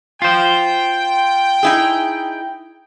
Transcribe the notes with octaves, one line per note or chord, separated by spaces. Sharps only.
F4 C5 G5
D#4 E4 G#4